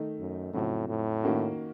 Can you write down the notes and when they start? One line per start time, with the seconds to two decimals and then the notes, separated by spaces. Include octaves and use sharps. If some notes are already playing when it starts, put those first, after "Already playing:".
Already playing: D#3 A3 D#4
0.20 F#2
0.53 F2 A2 C#3 F#3 C4 F#4
0.88 A2
1.23 D#3 A#3 C#4 F#4